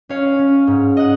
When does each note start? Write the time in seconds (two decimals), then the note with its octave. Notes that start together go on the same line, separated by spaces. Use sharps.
0.09 C#4 C#5 F5
0.39 C#4
0.67 G#2
0.97 D#5 F#5